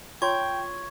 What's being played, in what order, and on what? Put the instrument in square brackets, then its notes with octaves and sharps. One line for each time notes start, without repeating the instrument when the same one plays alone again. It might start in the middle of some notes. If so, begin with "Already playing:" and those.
[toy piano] F4 C#5 C6 [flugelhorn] G5 [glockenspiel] C#6 G#6